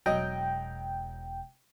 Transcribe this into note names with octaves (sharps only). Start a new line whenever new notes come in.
E1 F#3 B3 D#5 G5